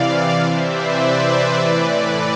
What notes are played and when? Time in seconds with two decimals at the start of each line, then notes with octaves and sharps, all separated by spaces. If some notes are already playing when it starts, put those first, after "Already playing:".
Already playing: C3 E3 D5 F5
0.41 C3 E3 C5 E5
0.70 B4 D5
1.58 A2 E3